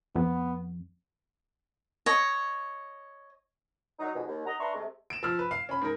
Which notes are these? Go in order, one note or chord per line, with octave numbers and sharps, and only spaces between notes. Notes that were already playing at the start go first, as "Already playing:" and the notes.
F2 B3
C#5 D#5
F#3 D#4
F2 G#2 B2
D#2
D#4 D#5 F#5 A#5
D4 B4 E5 A#5 C6 C#6
C3 G#3 A3
D7 E7
F3 E6 F6
B4
F5
C#4 B5
G#2 A#4